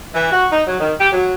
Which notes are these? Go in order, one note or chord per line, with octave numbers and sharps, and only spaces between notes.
E3
F#4
D#4
F#3
D#3
G4
F#3